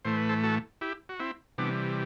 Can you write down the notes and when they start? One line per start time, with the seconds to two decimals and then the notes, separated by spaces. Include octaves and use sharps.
0.05 A2 E3 A3 C5
0.17 B4
0.29 A4 C5
0.43 F#4 A4
0.81 E4 G4
1.09 F#4
1.20 C4 E4
1.58 C3 E3 G3 B3 D4